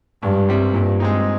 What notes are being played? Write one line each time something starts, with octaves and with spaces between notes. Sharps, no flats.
C#2 G2
C3 G3 C4
G2 A#2
G#3 C4 D#4